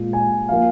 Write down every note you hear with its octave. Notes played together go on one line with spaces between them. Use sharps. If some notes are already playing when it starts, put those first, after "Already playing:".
Already playing: A#2 G#3
G#5
F3 A#3 F5